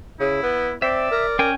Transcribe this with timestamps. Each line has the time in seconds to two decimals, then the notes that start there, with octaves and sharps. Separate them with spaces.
0.20 C#3 E4
0.43 B3
0.82 C4 D5 E5
1.11 A#4
1.39 C#4 A#4 G5 G#5